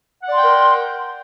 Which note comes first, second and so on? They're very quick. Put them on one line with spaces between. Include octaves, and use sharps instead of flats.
F#5 D5 C6 G5 A#4